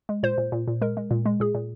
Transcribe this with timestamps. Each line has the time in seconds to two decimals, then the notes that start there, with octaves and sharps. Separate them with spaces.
0.09 G#3
0.23 A#2 C5
0.38 A#2
0.52 A#2
0.68 A#2
0.81 G#3 A#4
0.97 G#3
1.11 A#2
1.26 G#3
1.40 A#2 G#4
1.55 A#2